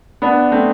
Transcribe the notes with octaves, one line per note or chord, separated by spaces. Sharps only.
B3 D4
A3 C4